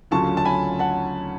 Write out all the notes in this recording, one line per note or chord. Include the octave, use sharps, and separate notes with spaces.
D2 C#3 F#3 C#4 F4 A5 C#6
A5
G#5 B5
F#5 A5